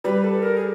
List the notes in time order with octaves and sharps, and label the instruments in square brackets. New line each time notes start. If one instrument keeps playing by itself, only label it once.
[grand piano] G3 [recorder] B4
[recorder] A4
A#4
G#4